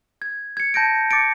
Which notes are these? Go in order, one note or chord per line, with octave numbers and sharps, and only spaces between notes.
G#6
G#6 C#7
A5 G6 A#6 D7
D6 A6 C#7 D7